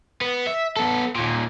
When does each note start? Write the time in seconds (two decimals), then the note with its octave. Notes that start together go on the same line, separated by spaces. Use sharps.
0.21 B3
0.47 E5
0.76 B3 A4
1.16 D#2 A#2